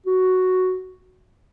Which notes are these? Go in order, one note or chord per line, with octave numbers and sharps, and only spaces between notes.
F#4